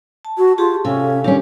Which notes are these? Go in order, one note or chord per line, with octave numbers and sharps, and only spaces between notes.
A5
F#4
F4 G4 G#4 A5
C3 C#4 A4 F5 G#5
D#3 G3 C#4 D4 G4 A#4